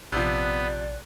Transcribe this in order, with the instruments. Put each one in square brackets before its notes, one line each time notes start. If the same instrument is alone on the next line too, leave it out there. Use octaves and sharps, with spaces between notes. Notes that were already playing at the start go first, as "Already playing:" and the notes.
[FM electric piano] A#1 F#6 [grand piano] C3 F3 [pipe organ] B3 [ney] D5